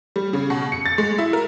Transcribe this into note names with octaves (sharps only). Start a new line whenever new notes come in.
G3
C#3
B2
C#7
A6
G#3
E4
A#4